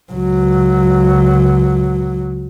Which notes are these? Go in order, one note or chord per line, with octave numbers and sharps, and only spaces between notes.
C#2 F#3